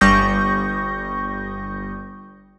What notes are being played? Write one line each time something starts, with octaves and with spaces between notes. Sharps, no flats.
G1 G3 C#6 D#6 G6 A#6